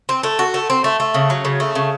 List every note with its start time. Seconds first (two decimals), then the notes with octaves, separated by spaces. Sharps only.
0.09 C4
0.23 A3
0.39 F#4
0.54 A3
0.70 C4
0.84 A3
1.00 A3
1.14 C#3
1.30 F#3
1.45 C#3
1.60 A3
1.75 C#3